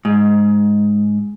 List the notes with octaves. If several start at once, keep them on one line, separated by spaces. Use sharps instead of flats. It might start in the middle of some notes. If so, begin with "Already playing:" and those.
G#2